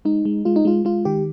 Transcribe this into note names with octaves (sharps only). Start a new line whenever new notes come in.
G#3 D#4
G#3
G#3 F4
D#4
G#3 F4
G#3 F4
D#3 G4